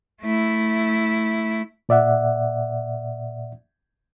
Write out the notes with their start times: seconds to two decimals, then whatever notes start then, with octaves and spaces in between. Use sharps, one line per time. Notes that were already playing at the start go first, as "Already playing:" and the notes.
0.22 A3 E4
1.89 A#2 D5 E5 F#5